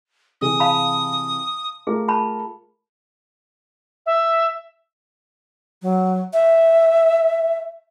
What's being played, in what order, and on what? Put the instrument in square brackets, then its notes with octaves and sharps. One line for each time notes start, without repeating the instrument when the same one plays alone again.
[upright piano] C3 E3 G#4 [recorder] D#6
[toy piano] F5 A5 B5
[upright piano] A3 F4 A#4 [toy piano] G#4
[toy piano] A5 B5
[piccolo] E5
[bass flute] F#3
E5